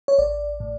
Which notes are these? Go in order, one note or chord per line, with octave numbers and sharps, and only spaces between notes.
C#5
A1 D5
A2